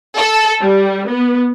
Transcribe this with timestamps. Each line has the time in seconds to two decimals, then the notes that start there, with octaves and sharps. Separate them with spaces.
0.18 A4
0.61 G3
1.07 B3